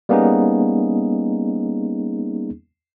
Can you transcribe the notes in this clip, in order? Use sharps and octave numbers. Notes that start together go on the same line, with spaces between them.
G3 A#3 B3 C#4 D#4 G#4